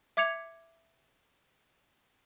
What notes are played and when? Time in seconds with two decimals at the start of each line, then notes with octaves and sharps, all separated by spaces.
0.17 E5 D6 G#6 C#7 F7